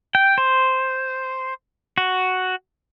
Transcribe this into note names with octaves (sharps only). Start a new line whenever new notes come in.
G5
C5
F#4